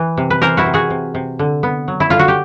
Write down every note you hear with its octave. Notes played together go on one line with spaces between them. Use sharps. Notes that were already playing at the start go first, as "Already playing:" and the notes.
Already playing: E3 B4
C3
B4
E3 A#4 C5
E4 F#4
C3
F#4 G#4
C3
C3
D3
B3
F#3
E4
D3 F4
F#4
G4